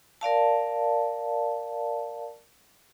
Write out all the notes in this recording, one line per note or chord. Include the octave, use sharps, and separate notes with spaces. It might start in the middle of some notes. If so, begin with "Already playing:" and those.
A#4 D5 F5 A5